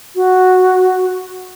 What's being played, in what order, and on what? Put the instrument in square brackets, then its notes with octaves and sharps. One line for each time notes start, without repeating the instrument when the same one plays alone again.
[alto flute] F#4